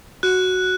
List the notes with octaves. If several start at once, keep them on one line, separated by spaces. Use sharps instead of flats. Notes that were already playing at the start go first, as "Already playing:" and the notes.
F#4 F#6